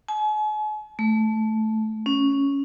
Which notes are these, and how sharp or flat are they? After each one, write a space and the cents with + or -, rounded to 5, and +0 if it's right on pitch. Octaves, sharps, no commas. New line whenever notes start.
G#5 +45
A3 -10
C#4 +0